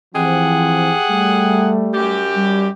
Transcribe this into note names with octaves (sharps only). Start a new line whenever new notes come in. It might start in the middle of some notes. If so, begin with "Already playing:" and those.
E3 F3 C4 G4 G#4 F#5
G3 A3
F#2 G4
G3